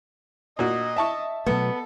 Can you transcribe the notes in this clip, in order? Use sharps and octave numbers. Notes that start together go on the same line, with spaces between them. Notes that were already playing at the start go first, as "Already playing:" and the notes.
A#2 F#4 D#5
E5 A5 C#6
B2 F#3 A3 B3 A4